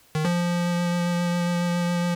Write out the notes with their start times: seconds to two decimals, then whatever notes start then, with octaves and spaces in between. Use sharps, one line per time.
0.15 D#3
0.25 F3